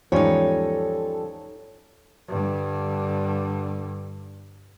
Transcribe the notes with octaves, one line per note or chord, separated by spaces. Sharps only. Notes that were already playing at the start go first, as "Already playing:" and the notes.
E2 G#2 F3 G3 C#4 D#4 A4 C#5
G2 D3